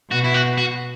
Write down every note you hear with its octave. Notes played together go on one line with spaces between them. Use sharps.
B2 F#4
E4
F#4
F#4